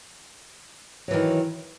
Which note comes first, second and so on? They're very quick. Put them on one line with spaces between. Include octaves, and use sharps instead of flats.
F#3 E3 D#3